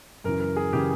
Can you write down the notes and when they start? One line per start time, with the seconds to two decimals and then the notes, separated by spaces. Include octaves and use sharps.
0.24 F#2 C#3 E3 A#4
0.40 A#4
0.57 G#4
0.73 C#3 E3 G4